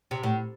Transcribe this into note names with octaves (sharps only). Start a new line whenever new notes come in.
C3
A2